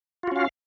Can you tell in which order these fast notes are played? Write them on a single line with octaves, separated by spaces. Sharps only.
F4 F#4 C#4 F5